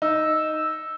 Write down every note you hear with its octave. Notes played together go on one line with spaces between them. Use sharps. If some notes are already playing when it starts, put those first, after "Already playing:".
D#4 E6